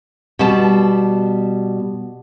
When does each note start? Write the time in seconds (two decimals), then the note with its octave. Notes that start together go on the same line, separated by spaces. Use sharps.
0.39 B2 G3 A5